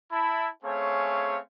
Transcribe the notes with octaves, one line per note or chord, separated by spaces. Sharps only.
E4 A5 B5
A3 C4 C#4 G#4 C#5 F5